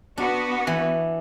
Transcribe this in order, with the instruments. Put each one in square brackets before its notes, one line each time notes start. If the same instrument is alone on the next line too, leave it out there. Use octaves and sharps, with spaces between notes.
[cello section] B3 F#4 [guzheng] D4
[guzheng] E3